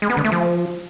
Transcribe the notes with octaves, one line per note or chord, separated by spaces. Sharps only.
G#3
B3
D3
A3
F3